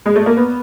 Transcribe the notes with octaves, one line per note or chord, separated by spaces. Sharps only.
G#3
A3
A#3
B3